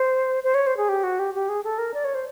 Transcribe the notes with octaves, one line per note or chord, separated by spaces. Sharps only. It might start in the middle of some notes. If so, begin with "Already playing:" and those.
Already playing: C5
C5
C#5
C5
G#4
G4
F#4
G4
G4
G#4
A4
A#4
D5
C#5
C5